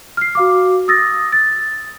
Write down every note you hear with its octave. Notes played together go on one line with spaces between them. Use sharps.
F6 C7
F#4 F5 D6
D#6 E6 A6 A#6
A6